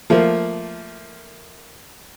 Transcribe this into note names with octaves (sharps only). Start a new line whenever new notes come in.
F3 A3 A#3